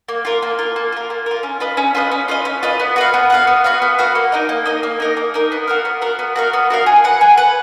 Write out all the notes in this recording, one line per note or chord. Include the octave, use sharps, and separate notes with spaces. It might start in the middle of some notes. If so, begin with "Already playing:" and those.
A#3
F4 A#4
A#3
F4 A#4
A#3
F4 A#4
A#3
F4 A#4
C#4
F4 B4 D#5
C#4
F4 B4 D#5
C#4
F4 B4 D#5
C#4
F4 B4 D#5
B3
F#4 B4 F5
B3
F#4 B4 F5
B3
F#4 B4 F5
B3
F#4 B4 F5
A#3
D#4 A#4 D#5
A#3
D#4 A#4 D#5
A#3
D#4 A#4 D#5
A#3
D#4 A#4 D#5
B3
F#4 A#4 F5
B3
F#4 A#4 F5
B3
F#4 A#4 F5
B3
F#4 A#4 F5
G#4
B4 F#5
G#4
B4 F#5